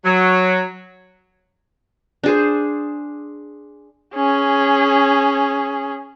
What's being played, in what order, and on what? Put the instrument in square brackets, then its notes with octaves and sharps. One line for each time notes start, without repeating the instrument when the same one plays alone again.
[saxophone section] F#3
[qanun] D4 G#4 C5
[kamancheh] C#4 G#4